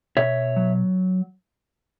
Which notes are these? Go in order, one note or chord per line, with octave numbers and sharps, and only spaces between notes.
B2 C#5 E5
F#3